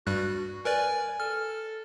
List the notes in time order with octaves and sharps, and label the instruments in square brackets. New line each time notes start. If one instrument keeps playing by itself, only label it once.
[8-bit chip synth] G2 G3 F#6 [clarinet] F#4
[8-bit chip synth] A#4 B4 D5 [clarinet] G#5
[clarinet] A4 [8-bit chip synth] F6